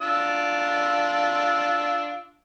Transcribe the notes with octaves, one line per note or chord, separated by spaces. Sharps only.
D4 F4 E6